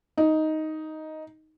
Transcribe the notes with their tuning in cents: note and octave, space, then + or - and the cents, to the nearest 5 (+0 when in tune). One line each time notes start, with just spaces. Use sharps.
D#4 +5